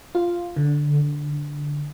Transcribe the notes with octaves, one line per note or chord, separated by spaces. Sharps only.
F4
D3